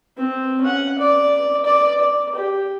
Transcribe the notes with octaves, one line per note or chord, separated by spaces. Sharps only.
C4
C#4 F#5
D5
D5
D5
G4